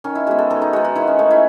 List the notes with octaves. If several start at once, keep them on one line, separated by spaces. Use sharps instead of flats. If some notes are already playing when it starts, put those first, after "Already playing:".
D#3 C#4
E4
G#3 B3 F#4
A4
D#3 A4
D#4
G#3 B3 F#4
F#4
D#3 E4
C#4
A3 D#4
E4